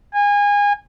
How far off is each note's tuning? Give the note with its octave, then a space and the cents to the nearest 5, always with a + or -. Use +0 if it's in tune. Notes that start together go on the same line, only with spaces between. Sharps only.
G#5 -25